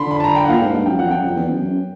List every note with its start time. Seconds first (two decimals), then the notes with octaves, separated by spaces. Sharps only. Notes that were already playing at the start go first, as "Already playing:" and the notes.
Already playing: D3 B5 C6
0.11 B5
0.20 A5
0.24 A#5
0.36 G5
0.45 F#5
0.49 A#2 F5
0.61 G#2
0.74 G2
0.86 F#2 G5
0.99 F2 F#5
1.11 F#2 G5
1.24 F2
1.36 E2
1.49 F#2
1.61 F#2